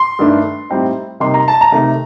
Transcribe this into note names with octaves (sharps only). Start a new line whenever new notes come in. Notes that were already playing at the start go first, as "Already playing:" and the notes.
Already playing: C6
G2 D#3 A3 D4
A2 G3 C4 D#4
C3 G3 A#3 D#4 C6
A#5
A5
A#5
C3 D#3 A3